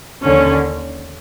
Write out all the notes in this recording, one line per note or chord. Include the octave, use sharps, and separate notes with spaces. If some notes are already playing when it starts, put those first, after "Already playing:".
D#2 D3 C#4